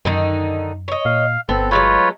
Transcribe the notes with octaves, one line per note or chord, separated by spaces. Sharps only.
F#2 D3 D#3 D#4
C#5 D#5
A#2 F5
G1 B3 C4 A4
F#3 G#3 A3 F4 B4 C#5